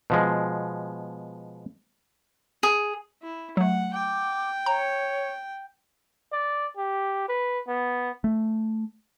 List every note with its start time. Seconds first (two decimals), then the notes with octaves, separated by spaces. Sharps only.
0.10 B2 F3 G#3
2.63 G#4
3.22 E4
3.57 F#3 A3 F#5
3.94 G5 D6
4.66 C#5 A#5
6.33 D5
6.77 G4
7.29 B4
7.68 B3
8.24 A3